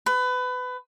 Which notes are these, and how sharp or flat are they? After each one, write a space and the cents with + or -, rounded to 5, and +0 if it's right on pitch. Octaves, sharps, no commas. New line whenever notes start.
B4 +25